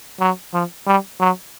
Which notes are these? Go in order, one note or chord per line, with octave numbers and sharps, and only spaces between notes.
F#3
F3
G3
F#3